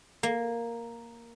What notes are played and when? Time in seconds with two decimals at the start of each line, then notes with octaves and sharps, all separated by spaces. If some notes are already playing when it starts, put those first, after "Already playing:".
0.23 A#3